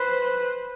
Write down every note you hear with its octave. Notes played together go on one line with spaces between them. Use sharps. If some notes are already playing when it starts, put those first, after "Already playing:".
Already playing: B4 C5